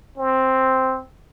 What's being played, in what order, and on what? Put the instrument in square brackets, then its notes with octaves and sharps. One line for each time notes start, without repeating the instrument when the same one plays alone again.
[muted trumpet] C4